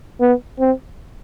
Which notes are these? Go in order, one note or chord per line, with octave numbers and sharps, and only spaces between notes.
B3
C4